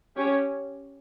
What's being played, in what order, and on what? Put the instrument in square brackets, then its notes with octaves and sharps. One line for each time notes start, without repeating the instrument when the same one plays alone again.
[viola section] C#4 G4 C#5